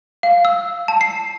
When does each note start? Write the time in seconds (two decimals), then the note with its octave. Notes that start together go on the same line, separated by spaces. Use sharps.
0.23 F5
0.45 E6
0.88 A5
1.01 C7